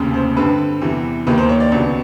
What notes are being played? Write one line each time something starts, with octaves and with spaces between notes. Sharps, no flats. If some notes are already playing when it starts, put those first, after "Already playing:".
Already playing: F1 D#2 C#3
C5
G2 D3 G3 C4 B4
E2 C3 E3 G3
D#2 D#3 G3 A#3 B4
C5
C#5
D5
C#2 B2 G3 B3